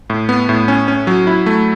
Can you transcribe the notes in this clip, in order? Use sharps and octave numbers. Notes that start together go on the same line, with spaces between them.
A2
B3
A2
C#4
C#4
F#3
E4
A3